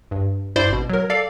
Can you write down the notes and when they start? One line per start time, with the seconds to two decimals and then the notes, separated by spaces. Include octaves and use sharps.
0.11 G2
0.56 G2 E4 C5 D5 C6
0.69 G#1 B2
0.90 F#3 A#4
1.10 A4 D5 F5